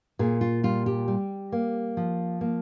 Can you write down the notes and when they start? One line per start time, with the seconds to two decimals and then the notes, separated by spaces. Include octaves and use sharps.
0.19 A#2 G#4
0.41 F4
0.63 G3 F4
0.86 G4
1.08 G3
1.52 A#3
1.97 F3
2.41 A#3